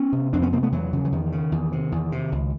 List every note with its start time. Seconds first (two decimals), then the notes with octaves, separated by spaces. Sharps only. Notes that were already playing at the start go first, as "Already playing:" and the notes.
Already playing: B3 C#4
0.12 C3
0.33 F2 C4 D4
0.42 B3 C#4
0.52 C3 A#3 C4
0.63 A3 B3
0.72 E2 E3 F#3
0.93 C#3
1.05 E3
1.12 E2 D#3
1.32 C#3
1.52 E2
1.72 C3
1.92 E2
2.12 C3
2.32 C#2